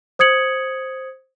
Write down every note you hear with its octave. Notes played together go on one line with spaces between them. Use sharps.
C5 D#6 G#6 C#7 F#7